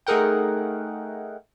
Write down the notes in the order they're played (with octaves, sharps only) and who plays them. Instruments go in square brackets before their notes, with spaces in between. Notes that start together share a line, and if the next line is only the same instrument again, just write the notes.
[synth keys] A3 D#4 G#4 A#4 F#5 G5